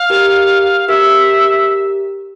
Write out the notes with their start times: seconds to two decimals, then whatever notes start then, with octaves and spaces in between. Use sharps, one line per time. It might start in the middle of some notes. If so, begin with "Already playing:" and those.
Already playing: F5
0.10 G4 A#4
0.88 G4 A#4 E5